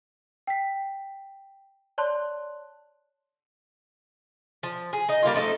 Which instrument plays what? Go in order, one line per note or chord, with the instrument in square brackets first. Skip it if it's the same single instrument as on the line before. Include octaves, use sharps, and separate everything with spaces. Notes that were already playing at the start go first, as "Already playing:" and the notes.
[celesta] G5 B6
C#5 D5 A5 C6 F#6
[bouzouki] F3
G#4
D#4 D#5
G3 A#3 D#4 F4
F3 A3 D#4 A4